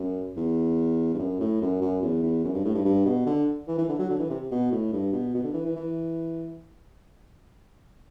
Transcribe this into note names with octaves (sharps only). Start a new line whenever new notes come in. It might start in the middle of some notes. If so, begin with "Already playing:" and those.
Already playing: F#2
E2
G2
F#2
A2
F#2
F#2
E2
E2
F#2
G2
A2
G2
G2
B2
D3
E3
E3
D3
F#3
D3
E3
C3
B2
A2
G2
B2
B2
D3
E3
E3
E3